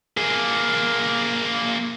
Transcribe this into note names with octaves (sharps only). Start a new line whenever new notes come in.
A#3 G#4